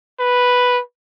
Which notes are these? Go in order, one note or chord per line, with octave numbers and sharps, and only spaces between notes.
B4